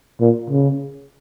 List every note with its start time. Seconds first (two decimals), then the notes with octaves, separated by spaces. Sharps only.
0.21 A#2
0.50 C#3